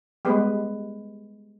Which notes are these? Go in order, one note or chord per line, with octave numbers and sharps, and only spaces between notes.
G3 G#3 B3 B4